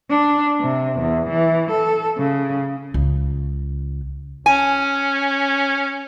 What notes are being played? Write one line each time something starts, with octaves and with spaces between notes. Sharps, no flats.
D4
C3
E2
E3
A4
C#3
C#2
C#4 G#5